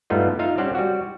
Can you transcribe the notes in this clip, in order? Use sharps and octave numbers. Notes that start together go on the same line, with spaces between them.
G2 G3 A3 B3 D#4 F4
D#4 F4 E5 F5
G3 C4 C#4 G4 C5 F#5
G3 F#4